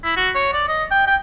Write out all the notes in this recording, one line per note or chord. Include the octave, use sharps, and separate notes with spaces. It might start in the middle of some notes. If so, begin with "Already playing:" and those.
E4
F#4
C#5
D5
D#5
G5
G5